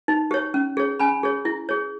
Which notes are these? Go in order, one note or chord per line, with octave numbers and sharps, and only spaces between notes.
D#4
G4 C#5
C#4
G#4 C#5
C#4 G#5 B5
G#4 C#5
E4
G#4 C#5